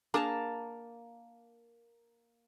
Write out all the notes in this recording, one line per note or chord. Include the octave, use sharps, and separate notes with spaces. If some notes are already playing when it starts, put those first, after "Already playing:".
A#3 D4 G#4 A#4 A5 A#5